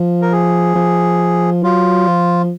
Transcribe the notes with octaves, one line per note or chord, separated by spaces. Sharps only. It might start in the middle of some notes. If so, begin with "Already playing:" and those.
Already playing: F3
A#4
G#4
F3
F#3 F4
F3